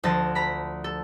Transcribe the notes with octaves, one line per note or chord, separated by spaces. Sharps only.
D2 F3 A5 A#6
A#5 B5 B6
A4